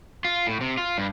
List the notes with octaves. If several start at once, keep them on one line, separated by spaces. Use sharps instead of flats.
F4
A2
C3
F4
G2